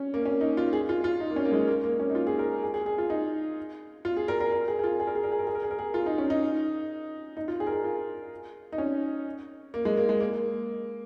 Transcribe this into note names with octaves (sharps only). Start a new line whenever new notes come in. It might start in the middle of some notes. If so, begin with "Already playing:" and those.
Already playing: C#4
A#3
C#4
D#4
F4
G#4
F4
F4
D#4
A#3
C#4
A#3
G#3
A#3
A#3
C#4
D#4
F4
G#4
A#4
G#4
G#4
G#4
F4
D#4
F4
G#4
A#4
A#4
A#4
G#4
G#4
F4
G#4
A#4
G#4
A#4
G#4
A#4
G#4
A#4
G#4
A#4
G#4
F4
D#4
C#4
D#4
D#4
F4
G#4
A#4
G#4
F4
D#4
C#4
A#3
G#3
A#3
G#3
A#3